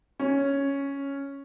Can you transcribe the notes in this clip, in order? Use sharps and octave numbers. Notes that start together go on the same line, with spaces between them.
C#4